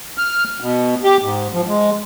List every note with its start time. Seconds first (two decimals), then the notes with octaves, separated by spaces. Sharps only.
0.18 F6
0.61 B2
1.03 G4
1.22 G#2
1.53 F3
1.67 G#3